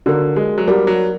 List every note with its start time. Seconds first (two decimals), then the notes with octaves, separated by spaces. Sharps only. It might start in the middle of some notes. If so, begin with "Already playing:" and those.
0.06 D3 F#4 A#4 D5
0.36 G#3
0.58 F#3
0.68 G3 F#4 A#4 D5
0.87 F#3